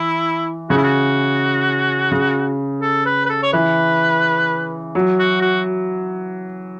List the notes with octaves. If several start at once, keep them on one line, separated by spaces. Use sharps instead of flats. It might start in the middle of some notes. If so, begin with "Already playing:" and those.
Already playing: E3 E4
C#3 F#4
E4
F#4
C#3
A4
B4
B4
A4
C#5
E3 B4
F#3
F#4
F#4